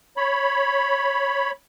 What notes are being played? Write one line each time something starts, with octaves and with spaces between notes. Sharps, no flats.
C#5 B5